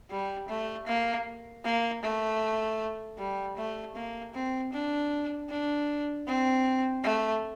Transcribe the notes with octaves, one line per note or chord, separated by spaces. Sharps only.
G3
A3
A#3
A#3
A3
G3
A3
A#3
C4
D4
D4
C4
A3